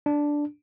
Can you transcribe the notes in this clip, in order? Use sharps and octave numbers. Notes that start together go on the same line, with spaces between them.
D4